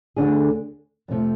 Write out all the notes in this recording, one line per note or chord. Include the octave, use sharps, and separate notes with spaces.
D2 D3 A3 D4 G#4
F2 C3 F3 A3